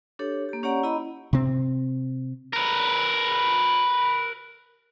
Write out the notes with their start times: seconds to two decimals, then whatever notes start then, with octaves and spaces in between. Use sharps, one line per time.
0.19 D4 G4 A4 C#5
0.49 A#3 G4
0.63 C#4 G4 C#5 D5 F#5 A#5
0.83 E4 D#5 A#5 B5
1.33 C3 C4
2.53 A#4 B4